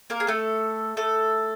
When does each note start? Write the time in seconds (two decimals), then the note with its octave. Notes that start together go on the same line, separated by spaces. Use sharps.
0.10 A#3 A#4
0.20 G#4
0.27 A3 A4
0.97 A3 A4